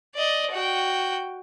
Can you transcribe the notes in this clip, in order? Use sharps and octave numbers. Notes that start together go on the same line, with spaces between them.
D5 D#5
F#4 G5